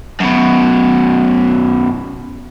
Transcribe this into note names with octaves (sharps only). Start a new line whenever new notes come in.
F#2 B2